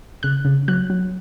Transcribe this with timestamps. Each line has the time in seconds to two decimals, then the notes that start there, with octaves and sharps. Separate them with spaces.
0.23 C#3 F#6
0.45 C#3
0.68 F#3 F#6
0.90 F#3